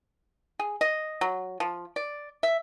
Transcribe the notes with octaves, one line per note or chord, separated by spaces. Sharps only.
G#4
D#5
F#3
F3
D5
E5